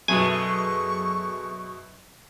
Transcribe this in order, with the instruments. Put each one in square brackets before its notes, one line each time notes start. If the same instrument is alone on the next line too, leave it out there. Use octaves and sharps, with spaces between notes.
[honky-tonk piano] F#2 B2 F#3 [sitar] G#3 A3 [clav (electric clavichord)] G#5 [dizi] C#6